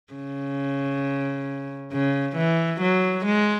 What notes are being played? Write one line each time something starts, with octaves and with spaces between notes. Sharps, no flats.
C#3
C#3
E3
F#3
G#3